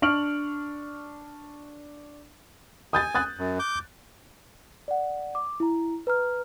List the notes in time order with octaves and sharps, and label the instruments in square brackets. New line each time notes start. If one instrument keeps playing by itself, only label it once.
[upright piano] D4 C#6 F6 D7 F#7
[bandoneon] G#5 [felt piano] D#6 G6 A6
[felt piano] D#6 F#6 A6
[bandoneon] F#2
D6 G6
[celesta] D5 F#5
D6
E4 A#5
B4 A#5 F6